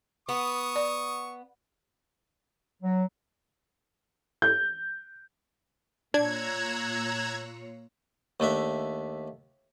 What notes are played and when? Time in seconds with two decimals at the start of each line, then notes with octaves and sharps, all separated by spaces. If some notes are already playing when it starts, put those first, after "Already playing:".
0.29 B3 C#6 D#6
0.76 D5
2.82 F#3
4.42 G6
6.14 A#2 D4 F4 C#5 A#5 E6 F#6 G#6
8.40 D#2 A3 D4 E5